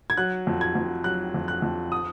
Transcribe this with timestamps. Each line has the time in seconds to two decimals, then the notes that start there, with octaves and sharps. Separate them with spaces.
0.10 G#6
0.17 F#3 F#6
0.47 F2
0.61 G#6
0.75 F2
1.04 F#3 F#6
1.34 F2
1.48 F#6
1.62 F2
1.92 D#6